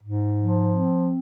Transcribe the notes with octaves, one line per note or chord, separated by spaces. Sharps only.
G#2
F3
C4